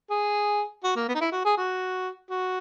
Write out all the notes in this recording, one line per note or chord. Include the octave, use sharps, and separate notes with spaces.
G#4
F#4
A#3
B3
D#4
E4
F#4
G#4
F#4
F#4